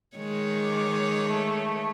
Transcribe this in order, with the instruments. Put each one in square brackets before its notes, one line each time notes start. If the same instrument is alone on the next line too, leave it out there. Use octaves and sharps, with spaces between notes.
[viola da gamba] D#3 G#3 C#5
[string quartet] D6
A3